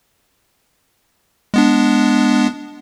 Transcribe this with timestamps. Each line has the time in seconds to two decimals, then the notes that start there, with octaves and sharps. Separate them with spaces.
1.54 G#3 B3 D4